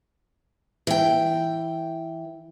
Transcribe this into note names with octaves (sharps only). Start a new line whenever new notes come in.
E3 G5